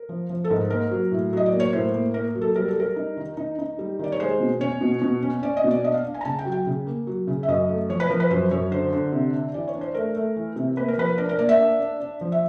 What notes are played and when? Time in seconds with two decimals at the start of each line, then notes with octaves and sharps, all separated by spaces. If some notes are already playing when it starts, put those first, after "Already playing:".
Already playing: A#4
0.09 F3
0.30 F3
0.44 A4
0.50 G#2 A#4
0.70 A#3 A#4
0.91 F#3
1.11 A2
1.33 F#3 D#5
1.46 D5
1.52 A#3
1.60 C#5
1.73 A2 C5
1.94 A#3
2.14 A#3 A#4
2.35 F#3
2.41 A4
2.55 G3 A#4
2.68 A4
2.76 G3 A#4
2.96 D#4
3.17 D#3
3.37 D#4
3.59 D#4
3.79 G3
3.99 D#3 D5
4.12 C#5
4.20 G#3 C5
4.40 B2
4.61 C#4 C#5
4.81 B2
5.02 B2
5.23 C#4
5.43 C#4 D5
5.57 D#5
5.64 B2
5.71 D5
5.84 D4 D#5
5.94 F5
6.05 D4
6.14 G#5
6.21 A#5
6.25 C#3 A5
6.39 G5
6.45 F#3
6.52 G5
6.66 C#3
6.87 A#3
7.07 F#3
7.27 C#3
7.43 E5
7.48 F#2 D#5
7.69 A3
7.89 F3 C#5
8.00 B4
8.10 F3 A#4
8.20 B4
8.30 F#2 C5
8.51 F#2 C#5
8.72 D3 C5
8.93 D3
9.12 C3
9.34 D4
9.54 E3 D5
9.68 C#5
9.75 D4
9.81 C5
9.94 A3 A#4
10.16 A3
10.36 E3
10.56 C3
10.77 A#3 B4
10.88 A#4
10.97 F3 B4
11.18 D4 A#4
11.29 A#4
11.39 A#3 D5
11.49 E5
11.59 D4
11.80 D4
12.00 D4
12.21 F3
12.32 E5